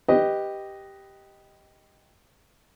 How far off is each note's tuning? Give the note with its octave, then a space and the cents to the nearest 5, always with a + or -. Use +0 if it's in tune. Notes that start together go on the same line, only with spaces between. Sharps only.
G4 +0 B4 +10 D#5 +0